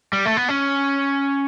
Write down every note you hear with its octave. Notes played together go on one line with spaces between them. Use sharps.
G3
A3
B3
C#4